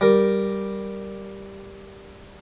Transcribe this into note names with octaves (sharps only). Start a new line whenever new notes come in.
G3 A#4